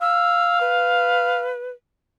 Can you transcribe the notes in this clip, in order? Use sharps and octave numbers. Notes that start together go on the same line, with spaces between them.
F5 E6
B4